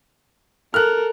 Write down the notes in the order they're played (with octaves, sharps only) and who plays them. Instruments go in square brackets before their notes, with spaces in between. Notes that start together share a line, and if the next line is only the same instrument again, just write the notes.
[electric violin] A4 A#4 [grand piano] F6 F#6